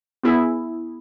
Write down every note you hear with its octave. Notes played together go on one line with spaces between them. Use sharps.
B3 E4 G#4